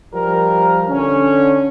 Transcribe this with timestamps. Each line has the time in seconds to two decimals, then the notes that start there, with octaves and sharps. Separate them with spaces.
0.14 F3 G3 A#4
0.89 D3 C#4